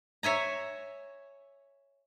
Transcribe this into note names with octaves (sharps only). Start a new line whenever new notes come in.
C#5 E5 G#5 A#5